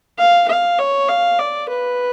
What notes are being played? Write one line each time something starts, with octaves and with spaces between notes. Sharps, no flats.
F5
F5
C#5
F5
D5
B4